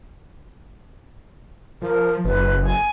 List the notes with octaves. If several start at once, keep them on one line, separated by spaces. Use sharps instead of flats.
F3 A#4
F#1 B4
G#5